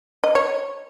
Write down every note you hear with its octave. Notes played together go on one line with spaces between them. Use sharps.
D#5
C#5